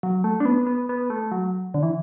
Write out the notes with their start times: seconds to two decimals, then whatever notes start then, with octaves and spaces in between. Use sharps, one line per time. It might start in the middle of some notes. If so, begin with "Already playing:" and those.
0.03 F#3
0.24 A3
0.40 D4
0.45 B3
0.67 B3
0.89 B3
1.10 A3
1.32 F#3
1.74 D3
1.83 E3